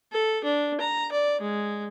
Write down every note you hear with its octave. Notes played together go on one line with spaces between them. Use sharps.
A4
D4
A#5
D5
G#3